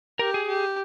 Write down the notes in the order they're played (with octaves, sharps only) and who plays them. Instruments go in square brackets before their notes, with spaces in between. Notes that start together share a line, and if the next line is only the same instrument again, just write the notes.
[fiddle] G4 [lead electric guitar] A#4
[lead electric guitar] G#4
[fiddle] G4